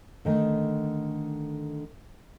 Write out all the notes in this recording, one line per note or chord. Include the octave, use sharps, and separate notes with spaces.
D3 D#3 A3